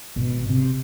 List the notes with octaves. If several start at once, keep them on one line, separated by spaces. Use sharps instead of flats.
G#1 B2
C3